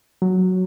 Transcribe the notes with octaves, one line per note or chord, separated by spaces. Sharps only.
F#3